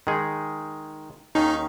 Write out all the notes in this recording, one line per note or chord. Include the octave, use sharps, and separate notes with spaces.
D#3 G#3 D#4 G#4
D#2 D#3 C#4 D#4 G#4